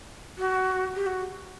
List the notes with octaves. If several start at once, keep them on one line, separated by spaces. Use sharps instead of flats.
F#4
G4
F#4